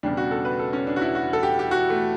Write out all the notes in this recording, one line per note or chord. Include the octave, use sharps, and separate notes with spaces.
E1 E2 C#3 G3 D4
F#4
A4
B4
A4
C#4
D4
F#4
E4
F#4
A4
G4
G4
F#4
A3